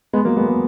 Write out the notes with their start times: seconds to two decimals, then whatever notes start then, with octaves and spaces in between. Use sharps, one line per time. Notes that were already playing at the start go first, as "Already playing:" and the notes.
0.13 G#3 B3
0.25 F#3 A#3
0.36 G#3 B3
0.48 G#3 B3